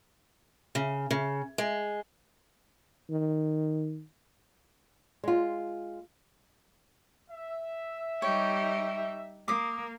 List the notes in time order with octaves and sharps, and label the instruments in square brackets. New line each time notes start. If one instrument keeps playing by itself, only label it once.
[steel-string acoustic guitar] C#3
C#3
G#3
[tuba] D#3
[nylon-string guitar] G#3 F4
[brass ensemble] E5
[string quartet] G3 D#4 G4 [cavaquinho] C#5
[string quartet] A#3 [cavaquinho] D6 D#6